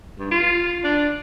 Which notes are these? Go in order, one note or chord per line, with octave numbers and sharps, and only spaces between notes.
G2
F4
D4